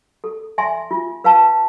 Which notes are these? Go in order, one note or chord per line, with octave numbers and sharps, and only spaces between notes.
A4
E5 G#5 C6
F4
B4 F5 A5